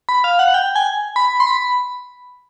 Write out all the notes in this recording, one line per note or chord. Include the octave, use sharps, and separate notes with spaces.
B5
F5
F#5
G5
G#5
B5
C6
B5